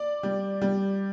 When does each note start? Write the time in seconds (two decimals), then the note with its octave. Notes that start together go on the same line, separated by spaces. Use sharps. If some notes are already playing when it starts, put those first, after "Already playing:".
Already playing: D5
0.23 G3
0.61 G3